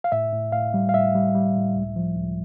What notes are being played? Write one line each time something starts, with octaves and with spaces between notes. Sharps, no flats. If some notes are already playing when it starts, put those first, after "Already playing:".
F5
A2 E5
A2
A2 F5
G3
F5
A2 E5
G3
G3
A2
C#2
F3
C#2